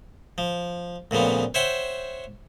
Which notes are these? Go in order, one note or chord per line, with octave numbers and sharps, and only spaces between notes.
F3
D2 A#2 C#3 F3 B3
C5 C#5 E5 F#5 G5 C6